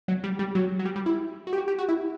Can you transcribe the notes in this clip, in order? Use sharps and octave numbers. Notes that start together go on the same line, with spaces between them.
F#3
G3
G3
F#3
F#3
G3
G3
E4
F#4
G4
F#4
G4
F#4
E4